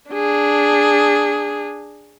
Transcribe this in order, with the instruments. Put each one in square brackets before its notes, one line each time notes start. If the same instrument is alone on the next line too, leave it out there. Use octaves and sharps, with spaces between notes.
[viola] D4 G#4